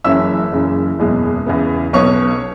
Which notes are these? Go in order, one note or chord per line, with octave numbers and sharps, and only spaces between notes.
F#1 F#2 E3 C#4 E5 E6
F#1 F#2 C#3 E3
F#1 E2 B2 G#3
E2 C#3 E3 B3
B1 B2 B3 C#5 C#6